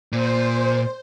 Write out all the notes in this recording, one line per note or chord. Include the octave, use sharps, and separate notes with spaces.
A#2 C5